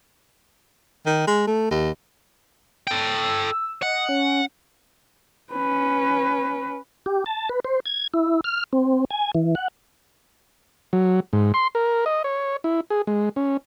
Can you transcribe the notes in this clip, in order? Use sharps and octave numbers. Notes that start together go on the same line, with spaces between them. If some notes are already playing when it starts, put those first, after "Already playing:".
D#3
G#3
A3
D#2
A4 G5
E6
D#5 F#5
C#4
C#4 B4
G4
A5
B4
C5
G#6
E4
F6
C4
G#5
E3
F#5
F#3
G#2
C6
A#4
D#5
C#5
E4
G#4
G#3
C#4